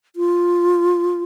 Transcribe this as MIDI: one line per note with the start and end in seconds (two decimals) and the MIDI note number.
0.16 1.24 65